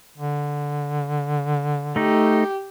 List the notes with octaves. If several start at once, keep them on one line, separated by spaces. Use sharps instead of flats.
D3
A3 D#4 G4